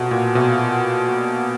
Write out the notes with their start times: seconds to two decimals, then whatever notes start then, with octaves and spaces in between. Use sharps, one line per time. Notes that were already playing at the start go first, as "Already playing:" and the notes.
Already playing: B2 F#3 A3 C4 F4
0.11 A#2
0.34 B2 F#3 A3 C4 F4
1.07 F#3 A#3 D4